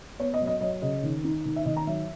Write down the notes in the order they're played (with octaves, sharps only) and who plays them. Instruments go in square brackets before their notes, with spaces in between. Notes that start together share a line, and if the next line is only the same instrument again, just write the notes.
[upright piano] B3 C#5
D#5
F#3
D#5
F#3 D#5
C#3 D#5
D#3
D#4
D#3
E5
D#3 D#5
A#5
F#3 E5